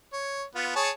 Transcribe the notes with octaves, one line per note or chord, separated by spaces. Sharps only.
C#5
B3 F4
G#4 C#5 A5